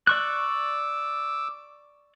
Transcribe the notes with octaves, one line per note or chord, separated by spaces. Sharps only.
D5 C#6 D6 E6 F#6